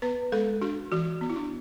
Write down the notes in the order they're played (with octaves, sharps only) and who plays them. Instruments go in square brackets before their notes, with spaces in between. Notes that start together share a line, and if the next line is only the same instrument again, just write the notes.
[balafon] B3 B4
G#3 A4
D4 F#4
E3 F#4
B3
E4
D4